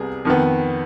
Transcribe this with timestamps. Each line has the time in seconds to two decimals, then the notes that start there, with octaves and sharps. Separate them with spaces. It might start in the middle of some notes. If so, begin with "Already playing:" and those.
Already playing: C2 C3 G3 B3 G#4
0.25 F2 D#3 B3